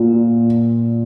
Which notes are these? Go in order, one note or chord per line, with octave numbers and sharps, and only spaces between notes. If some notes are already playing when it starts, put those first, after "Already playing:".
Already playing: A#2